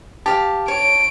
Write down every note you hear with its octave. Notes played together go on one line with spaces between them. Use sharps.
G4 F5 A5
C#5 D7